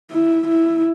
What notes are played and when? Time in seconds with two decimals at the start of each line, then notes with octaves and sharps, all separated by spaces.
0.11 E4
0.48 E4